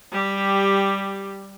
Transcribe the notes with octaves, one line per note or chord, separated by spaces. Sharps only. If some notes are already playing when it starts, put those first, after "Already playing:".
G3 G4